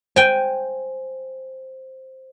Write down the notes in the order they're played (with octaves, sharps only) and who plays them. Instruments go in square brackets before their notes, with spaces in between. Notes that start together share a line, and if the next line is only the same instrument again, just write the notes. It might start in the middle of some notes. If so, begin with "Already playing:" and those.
[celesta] C5 [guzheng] G5 G#5